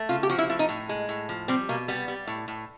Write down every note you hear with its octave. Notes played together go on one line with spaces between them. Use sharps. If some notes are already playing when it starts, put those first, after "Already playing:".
Already playing: A3
C#3 F4
G4
F3 F#4
E4
A3 E4
D#4
A2
G#3
A2
F3
G3 C4
B2 A#3
G3 B3
G3
A2
A2